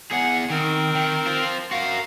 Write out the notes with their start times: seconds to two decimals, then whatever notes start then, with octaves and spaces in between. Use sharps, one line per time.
0.12 E2 G#4 F#5
0.50 D#3 C4 A#4
0.95 D#3
1.26 F4 C5
1.71 F#4 A#4 F5